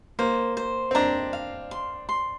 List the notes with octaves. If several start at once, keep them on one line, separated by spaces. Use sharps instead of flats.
A#3 C5
C5
C4
D4 A#5
F5
C6
C6